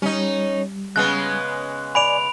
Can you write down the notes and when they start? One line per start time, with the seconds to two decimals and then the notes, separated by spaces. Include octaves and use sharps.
0.02 G3 C#4 D#4
0.96 C#3 G#3 B3 F#6
1.95 D5 G#5 B5 D7 F7